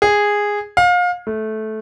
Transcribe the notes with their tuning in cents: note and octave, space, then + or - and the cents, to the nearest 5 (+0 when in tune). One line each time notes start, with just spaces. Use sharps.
G#4 -10
F5 +30
A3 -15